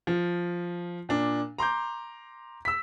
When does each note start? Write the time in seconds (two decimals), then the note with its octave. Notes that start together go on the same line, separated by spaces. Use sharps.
0.07 F3
1.09 A#2 D4
1.58 A#5 C6 D6 G6
2.65 E6 B6